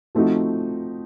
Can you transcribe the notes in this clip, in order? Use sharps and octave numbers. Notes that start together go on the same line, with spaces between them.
F3 A3 C4 D#4 F#4